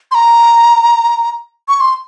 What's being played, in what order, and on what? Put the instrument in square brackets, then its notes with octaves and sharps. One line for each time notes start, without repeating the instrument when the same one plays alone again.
[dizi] C6
A#5
C#6
C6